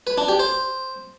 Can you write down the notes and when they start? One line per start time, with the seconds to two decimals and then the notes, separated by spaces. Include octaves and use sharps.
0.07 B4
0.18 D4
0.28 G4
0.39 C5